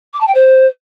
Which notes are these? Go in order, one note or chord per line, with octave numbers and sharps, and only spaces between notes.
D6
A5
G5
C5